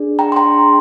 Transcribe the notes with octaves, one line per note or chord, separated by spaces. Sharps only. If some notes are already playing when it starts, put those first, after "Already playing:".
Already playing: D4 G#4
G5 A#5
C6
G5 A#5